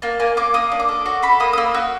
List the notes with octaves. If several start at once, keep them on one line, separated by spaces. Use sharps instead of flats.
A#3 A5
A#3 G#5
A#3 D6
A#3 D#6
D4
D6
A4
F#4 C#6
A4 B5
A#3 D#6
D#6
A#3 E6
F#4 E6